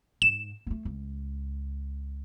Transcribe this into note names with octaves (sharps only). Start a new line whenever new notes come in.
G#2 E7
A3 B3
C#2